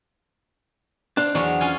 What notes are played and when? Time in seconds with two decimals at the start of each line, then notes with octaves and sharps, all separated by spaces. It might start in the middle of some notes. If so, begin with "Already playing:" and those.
1.17 D4 C5 F5
1.35 E2 F#3 B3 D4 C#5
1.60 C#4 F4 G#5